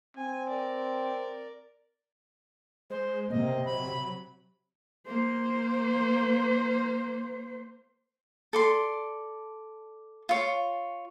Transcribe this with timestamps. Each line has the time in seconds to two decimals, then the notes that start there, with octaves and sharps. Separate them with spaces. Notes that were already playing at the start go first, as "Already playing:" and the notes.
0.17 C4 G#5
0.48 A#4 D5
2.90 G#3 C5
3.30 C3 A#3 D#5
3.66 F#3 B5
5.07 A#3 C5
8.53 A4 D5 C6
10.29 F4 C#5